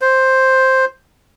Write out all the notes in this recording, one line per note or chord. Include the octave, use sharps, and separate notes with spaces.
C5